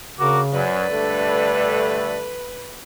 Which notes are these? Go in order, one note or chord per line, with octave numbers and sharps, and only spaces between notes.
D2 C#3 F#4 A#4 D6
F#2 F#3 B4 D5
G2 D3 A3 A4